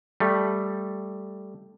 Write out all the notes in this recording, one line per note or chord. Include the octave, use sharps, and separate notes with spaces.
G3 A3